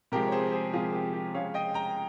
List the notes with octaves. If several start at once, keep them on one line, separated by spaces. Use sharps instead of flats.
C3 F3 G#3 G4 A#4
C#5
G#4 C5
G#4 C5
C3 F3 G#3 F4 G#4
G4
G4
C#3 G#3 C#5 F5
D#5 G5
G5 A#5